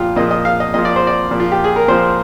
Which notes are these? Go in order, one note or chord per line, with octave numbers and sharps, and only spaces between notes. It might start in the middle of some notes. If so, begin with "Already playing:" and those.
Already playing: A#2 F3 F4 G4
A#2 F3 D#5
D#5
F5
D#5
A#2 F3 D#5
D5
C5
D5
A#2 F3
F4
G4
G#4
A#4
A#2 F3 C5